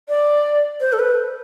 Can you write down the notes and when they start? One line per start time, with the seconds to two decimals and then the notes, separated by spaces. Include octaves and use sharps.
0.09 D5
0.81 C5
0.93 A4
0.99 B4